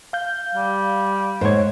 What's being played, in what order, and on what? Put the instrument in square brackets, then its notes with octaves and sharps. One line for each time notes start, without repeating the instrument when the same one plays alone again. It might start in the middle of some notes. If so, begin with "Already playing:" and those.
[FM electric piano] F5 G6
[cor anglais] G3
[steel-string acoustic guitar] G#2 [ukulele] C5 C#5